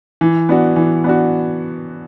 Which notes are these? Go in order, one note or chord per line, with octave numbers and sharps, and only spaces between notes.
E3
B3 D4 F#4
E3
B3 D4 F#4